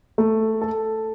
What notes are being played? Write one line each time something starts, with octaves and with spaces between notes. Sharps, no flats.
A3
A4